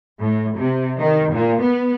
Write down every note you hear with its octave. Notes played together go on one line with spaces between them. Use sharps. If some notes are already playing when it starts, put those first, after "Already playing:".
A2
C3
D#3
A#2
B3